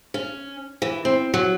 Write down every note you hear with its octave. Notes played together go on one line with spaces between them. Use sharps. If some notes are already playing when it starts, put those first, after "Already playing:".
C#4
E3
C4
F#3